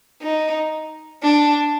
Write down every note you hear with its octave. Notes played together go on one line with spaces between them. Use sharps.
D#4
D4